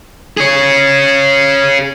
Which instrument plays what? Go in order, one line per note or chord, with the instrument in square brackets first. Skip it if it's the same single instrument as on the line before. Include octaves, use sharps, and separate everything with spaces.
[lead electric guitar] G#4 C#5